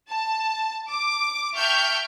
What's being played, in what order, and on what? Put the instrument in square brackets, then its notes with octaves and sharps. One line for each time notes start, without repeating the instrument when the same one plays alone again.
[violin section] A5
D6
E5 G5 A5 C#6 F6 G6